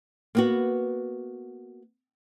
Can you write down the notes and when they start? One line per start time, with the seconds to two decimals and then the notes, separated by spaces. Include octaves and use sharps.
0.35 A#3 B3 F#4